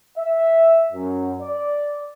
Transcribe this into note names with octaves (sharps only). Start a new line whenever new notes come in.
E5
F#2
D5